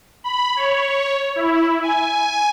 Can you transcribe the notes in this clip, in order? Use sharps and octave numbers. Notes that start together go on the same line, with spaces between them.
B5
C#5
E4
G#5